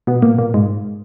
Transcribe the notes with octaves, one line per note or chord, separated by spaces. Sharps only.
B2 B3
A#2 A#3
A#2 A#3
G#2 G#3